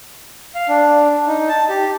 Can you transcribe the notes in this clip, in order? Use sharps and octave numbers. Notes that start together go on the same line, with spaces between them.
F5
D4
D#4
A5
G4